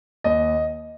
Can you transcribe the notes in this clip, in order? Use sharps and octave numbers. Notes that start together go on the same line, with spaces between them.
D#2 D#5